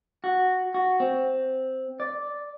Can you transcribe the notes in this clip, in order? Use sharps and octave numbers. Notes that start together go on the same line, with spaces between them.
F#4
F#4
C4
D5